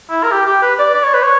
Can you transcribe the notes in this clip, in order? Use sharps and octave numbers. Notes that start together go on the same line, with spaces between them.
E4
A#4
G4
G4
B4
D5
D5
C#5
B4
C#5